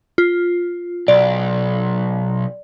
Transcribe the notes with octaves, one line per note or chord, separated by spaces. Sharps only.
F4
B1 D5